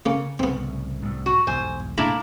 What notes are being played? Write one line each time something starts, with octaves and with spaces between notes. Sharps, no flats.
C#3 A#3 C#4
C2 A2 C#3 B3 C4
C2 A2
F#4
B1 E2 G2 C5 G#5
A3 A#3 D4 E4 E5 A#5 B5